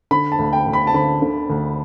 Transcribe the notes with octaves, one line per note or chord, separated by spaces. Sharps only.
D3 B5
A5
D2
G5
D2
B5
A5
D3 B5
D3
D2